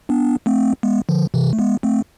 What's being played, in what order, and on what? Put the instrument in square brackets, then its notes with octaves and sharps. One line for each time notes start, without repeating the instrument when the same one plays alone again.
[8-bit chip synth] B3 D4
A3 C4
G#3 B3
D3 F3
C3 E3
A3
G#3 B3
A3 C4